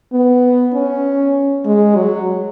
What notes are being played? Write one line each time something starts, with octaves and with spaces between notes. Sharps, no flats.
B3
C#4
G#3
F#3